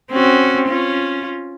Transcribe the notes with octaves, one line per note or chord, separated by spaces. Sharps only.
C4 C#4 F#4
C#4 F4